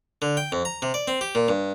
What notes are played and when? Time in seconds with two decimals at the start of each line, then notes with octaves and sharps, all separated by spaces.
0.22 D3
0.37 G5
0.52 F2
0.65 A#5
0.82 C3
0.94 D5
1.08 C4
1.21 G4
1.35 A#2
1.48 G2